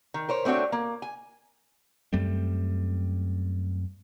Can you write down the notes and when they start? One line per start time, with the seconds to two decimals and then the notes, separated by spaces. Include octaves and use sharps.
0.14 D#3
0.29 A#4 C5 C#5
0.45 A3 C4 D4 F#4 C#5
0.72 A#3
1.02 G#5
2.13 F#2 G3 A3 C4